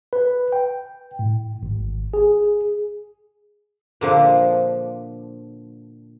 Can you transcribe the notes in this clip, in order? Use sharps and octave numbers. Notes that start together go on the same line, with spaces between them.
B4
G5
A2
G#1
G#4
A#2 D3 F3